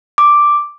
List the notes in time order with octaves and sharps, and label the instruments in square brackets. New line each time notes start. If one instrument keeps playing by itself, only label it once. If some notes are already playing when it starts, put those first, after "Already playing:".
[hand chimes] D6